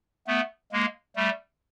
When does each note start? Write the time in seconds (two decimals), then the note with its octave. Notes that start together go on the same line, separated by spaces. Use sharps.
0.27 A3 B3
0.72 G#3 A#3
1.16 G3 A3